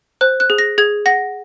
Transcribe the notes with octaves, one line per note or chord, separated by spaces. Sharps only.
C5 F#6
F#6
G#4
A#6
G#4 G#6
F#5 A#6